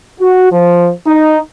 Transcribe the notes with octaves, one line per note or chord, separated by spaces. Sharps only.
F#4
F3
D#4